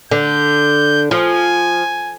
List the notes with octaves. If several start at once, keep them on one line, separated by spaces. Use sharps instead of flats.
D3 G6
F3 G#5